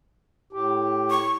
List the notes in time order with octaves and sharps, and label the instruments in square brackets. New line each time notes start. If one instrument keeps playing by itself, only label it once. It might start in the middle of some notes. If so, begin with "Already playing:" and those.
[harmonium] A2 G4
[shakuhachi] C#6